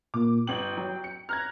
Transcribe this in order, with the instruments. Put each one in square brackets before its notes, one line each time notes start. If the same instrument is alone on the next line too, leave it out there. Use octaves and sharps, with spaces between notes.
[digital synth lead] A#2 [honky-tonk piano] D6
[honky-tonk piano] G1 F#7 [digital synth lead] G5
[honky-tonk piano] F#3
C#7
[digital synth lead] A#5 [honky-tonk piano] F6 F#6 G#6